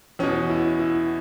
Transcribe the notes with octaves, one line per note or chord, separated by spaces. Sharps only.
E2 B2 C#4
E4
E4